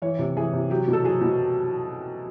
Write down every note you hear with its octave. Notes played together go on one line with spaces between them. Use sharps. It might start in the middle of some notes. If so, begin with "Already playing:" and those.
E3 C#5
C3
E3 G#4
C3
F#3 G4
B2
A4
F#3 G#4
B2